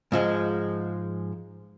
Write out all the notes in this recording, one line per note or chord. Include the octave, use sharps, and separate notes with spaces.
G#2 F3 G#3